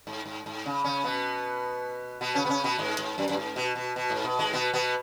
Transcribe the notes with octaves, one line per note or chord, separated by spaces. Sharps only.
G#2
G#2
G#2
C#3
C#3 C#4
B2 B3
B2 B3
C#3 C#4
B3
C#3 C#4
B2 B3
G#2 G#3
G#2
F#2
F#2
G#2
B2
B2
B2
G#2
B2
G#2 G#3
B2 B3
B2 B3